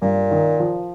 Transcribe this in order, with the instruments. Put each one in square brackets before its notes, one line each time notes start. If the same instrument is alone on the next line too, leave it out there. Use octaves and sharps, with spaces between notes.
[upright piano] G2 [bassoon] A#2
[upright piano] D#3
F3